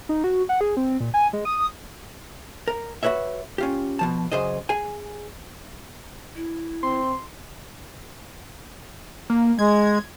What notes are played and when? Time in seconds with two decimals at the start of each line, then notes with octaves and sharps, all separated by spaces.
0.09 D#4
0.24 F#4
0.49 F#5
0.61 G#4
0.77 C4
1.00 A#2
1.14 G#5
1.33 G#3
1.45 D#6
2.68 A#4
3.03 F#4 G4 B4 C#5 E5
3.58 C#4 F4 G4
3.99 B2 F3 A5
4.32 F#2 C#3 G#4 C5 D#5
4.69 G#4 G#5
6.36 E4
6.83 C4 C6
9.30 A#3
9.59 G#3 G#6